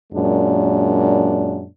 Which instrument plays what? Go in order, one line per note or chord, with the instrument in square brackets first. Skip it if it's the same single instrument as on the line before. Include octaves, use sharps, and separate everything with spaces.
[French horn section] F#2 A#2 G#3 D4